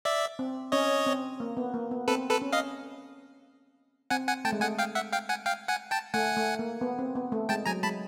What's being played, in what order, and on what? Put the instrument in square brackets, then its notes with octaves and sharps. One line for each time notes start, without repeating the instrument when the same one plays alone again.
[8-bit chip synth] D5 E5
[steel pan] C4
[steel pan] C#4 [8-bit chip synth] C#5 D#5
[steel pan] C4
A#3
B3
A#3
B3
[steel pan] C4 [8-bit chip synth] A4 B4
[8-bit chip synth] A4 B4
[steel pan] C#4
[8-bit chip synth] D#5 F5
[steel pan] C4 [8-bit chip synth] F#5 G#5
[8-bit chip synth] F#5 G#5
[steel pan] A3 [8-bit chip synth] G5 A5
[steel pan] G#3
[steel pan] A3 [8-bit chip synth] F#5 G#5
[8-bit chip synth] F5 G5
E5 F#5
F5 G5
F#5 G#5
F5 G5
F#5 G#5
G5 A5
[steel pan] A3 [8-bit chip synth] F#5 G#5
[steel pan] A3
A#3
B3
C4
B3
A3
[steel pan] G#3 [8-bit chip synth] G5 A5
[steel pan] F#3 [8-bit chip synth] G#5 A#5
[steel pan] G#3 [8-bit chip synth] A5 B5